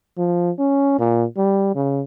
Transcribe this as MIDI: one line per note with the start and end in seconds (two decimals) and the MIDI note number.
0.18 0.51 53
0.59 0.94 61
0.99 1.24 46
1.38 1.71 55
1.75 2.02 49